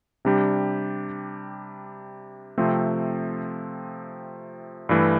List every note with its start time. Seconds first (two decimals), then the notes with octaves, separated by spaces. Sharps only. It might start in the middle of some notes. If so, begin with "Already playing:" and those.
0.25 C3 G3 D4 G4
2.58 C3 F3 A3 C4
4.89 G2 E3 A3